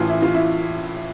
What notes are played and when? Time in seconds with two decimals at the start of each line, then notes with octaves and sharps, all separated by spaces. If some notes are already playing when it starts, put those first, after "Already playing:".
Already playing: A1 A2 E3 F4
0.09 E4
0.22 F4
0.34 E4